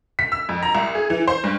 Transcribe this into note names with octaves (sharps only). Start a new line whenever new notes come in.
B6
E6
F2
A#5
C2
G#4
E3
C5
G2